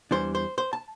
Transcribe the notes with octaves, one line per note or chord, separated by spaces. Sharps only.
E2 E3 G3 D4 C5
C5
C5
A5